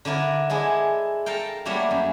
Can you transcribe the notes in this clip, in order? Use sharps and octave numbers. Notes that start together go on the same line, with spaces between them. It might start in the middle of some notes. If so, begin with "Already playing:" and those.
D3 D4 E4 A#4
G#3 D4 E4 G#4
A4 A#4 F5 G5
F#3 G3 A3 A#3 D4 E4
F#2